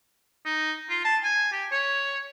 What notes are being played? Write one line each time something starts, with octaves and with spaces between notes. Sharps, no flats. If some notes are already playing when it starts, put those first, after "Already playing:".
D#4
F4
A5
G#5
G4
C#5